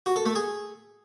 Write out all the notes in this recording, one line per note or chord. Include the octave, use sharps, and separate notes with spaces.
F#4
A4
A3
G#4